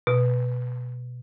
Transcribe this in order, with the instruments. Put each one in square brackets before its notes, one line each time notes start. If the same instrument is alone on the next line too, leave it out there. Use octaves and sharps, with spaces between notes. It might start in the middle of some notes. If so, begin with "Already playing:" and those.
[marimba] B2